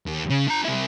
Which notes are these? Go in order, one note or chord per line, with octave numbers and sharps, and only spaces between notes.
D#2
C#3
D4 A#5
C3 E4